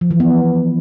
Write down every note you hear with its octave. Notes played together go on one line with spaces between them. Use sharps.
F3
E3
B3